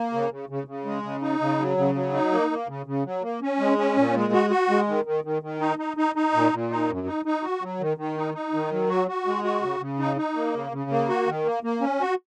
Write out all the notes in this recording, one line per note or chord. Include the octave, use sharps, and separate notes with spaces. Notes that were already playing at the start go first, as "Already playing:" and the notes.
Already playing: A#3
C#3
C#3
C#3
C#3
G#3
C#3
D#4
C#3
F#3
C#3
F#3
D#4
A#3
A#3
C#3
C#3
F#3
A#3
C#4
G#3
C#4
A#2
G#3
F#4
F#4
G#3
D#3
D#3
D#3
D#3
D#4
D#4
D#4
D#4
A#2
A#2
D#4
F#2
D#4
D#4
F#4
F#3
D#3
D#3
D#4
D#4
D#3
F#3
F#4
F#4
G#3
F#4
C#3
C#3
D#4
D#4
A#3
C#3
C#3
A#3
F#4
D#3
A#3
A#3
C#4
F#4